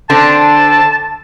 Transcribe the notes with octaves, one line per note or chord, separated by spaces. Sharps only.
D3 C4 D4 A5